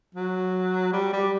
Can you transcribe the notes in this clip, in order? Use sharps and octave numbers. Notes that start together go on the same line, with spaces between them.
F#3
G3
G3